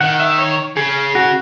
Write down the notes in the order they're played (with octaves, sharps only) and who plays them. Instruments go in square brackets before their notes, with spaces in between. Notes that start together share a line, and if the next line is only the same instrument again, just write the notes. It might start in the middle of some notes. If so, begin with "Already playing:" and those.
[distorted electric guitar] D#3 [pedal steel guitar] F#5
[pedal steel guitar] E5
C#5
[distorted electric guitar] C#3 [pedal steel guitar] G#4
[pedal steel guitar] F#4